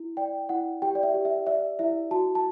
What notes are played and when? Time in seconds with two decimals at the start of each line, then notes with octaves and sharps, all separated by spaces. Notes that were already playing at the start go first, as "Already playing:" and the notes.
Already playing: E4
0.17 D5 G5
0.49 E4 F#5
0.82 G4 G5
0.95 D5
1.03 E5
1.14 G4
1.25 E5
1.46 D5 E5
1.79 E4 E5
2.11 F#4 A5
2.35 A5